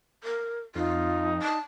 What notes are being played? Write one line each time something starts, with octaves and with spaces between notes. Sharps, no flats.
A#4
F2 D#4 F4
A5